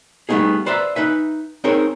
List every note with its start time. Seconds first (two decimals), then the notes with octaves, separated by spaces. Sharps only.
0.29 G3 A3 B3 C4 D#4 G#4
0.66 B4 C5 D5 E5 A#5
0.95 D#4 B4 E5 G#5
1.64 C4 D#4 G#4 A#4 C5 C#5